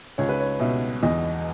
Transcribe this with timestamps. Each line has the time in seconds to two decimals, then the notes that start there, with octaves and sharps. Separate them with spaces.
0.18 C#2 C#5
0.29 B4
0.40 C#5
0.60 B2 E5
1.03 E2 D#5